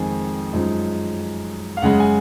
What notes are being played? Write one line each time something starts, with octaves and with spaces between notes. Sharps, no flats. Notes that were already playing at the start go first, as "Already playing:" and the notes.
Already playing: F2 D#3 G#3 C4 D#4 G#5
F#2 F3 G#3 D#4
F5
F#2 C#3 G#3 F#5
G#5